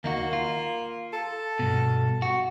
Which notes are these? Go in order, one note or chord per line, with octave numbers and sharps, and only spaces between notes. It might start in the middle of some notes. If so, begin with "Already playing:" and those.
D#2 A#3 D#4 F#4
F4
A4
G2 B2
F#4